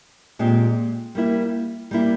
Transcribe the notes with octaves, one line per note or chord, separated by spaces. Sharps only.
A#2 G#3 C4 G4
G3 A#3 E4
G3 A#3 E4